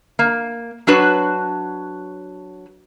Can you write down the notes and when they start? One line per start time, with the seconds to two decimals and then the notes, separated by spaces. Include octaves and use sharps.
0.19 A#3
0.87 F#3 D4 F#4 B4 C#5